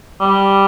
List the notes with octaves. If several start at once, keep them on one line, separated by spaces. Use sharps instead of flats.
G3